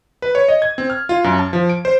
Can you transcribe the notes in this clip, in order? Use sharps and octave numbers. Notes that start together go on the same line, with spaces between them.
B4
C#5
D#5
G#6
C4
F6
F4
F#2
A5
F3
D7
C5